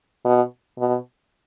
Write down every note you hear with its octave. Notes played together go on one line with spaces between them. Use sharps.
B2
B2